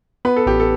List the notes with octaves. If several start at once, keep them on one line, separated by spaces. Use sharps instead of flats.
B3 B4
A4
A1 G4
A4